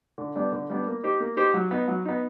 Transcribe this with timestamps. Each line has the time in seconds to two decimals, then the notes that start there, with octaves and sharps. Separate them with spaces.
0.18 D3
0.36 G3 B3 D4
0.52 D3
0.70 G3 B3 D4
0.86 A#3
1.03 D#4 G4 C5
1.20 A#3
1.37 D#4 G4 C5
1.54 F#3
1.71 B3 D#4
1.88 F#3
2.05 B3 D#4